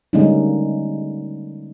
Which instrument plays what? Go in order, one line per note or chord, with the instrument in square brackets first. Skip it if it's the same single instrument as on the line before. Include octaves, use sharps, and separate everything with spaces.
[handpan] D3 G3 G#3 A#3 C#4 D#4